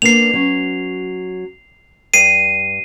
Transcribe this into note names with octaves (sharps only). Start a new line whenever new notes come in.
A#3 B3 D4 C7 F7
F#3 C#4
G2 C7 D#7